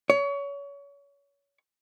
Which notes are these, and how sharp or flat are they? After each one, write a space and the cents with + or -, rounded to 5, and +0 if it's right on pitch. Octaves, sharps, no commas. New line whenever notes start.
C#5 +30